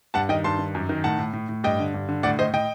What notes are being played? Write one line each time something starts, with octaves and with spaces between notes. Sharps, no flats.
G2 F#5 A5
D#3 D#5 G5
G2 A5 C6
D#3
F#2
D#3
A2 F#5 A5
A2
A2
A2
G2 D#5 G5
D3
G2
D3
A2 D5 F#5
A2 C5 D#5
A2 D#5 G5